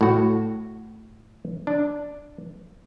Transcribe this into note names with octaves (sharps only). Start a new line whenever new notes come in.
A2 F#4
D4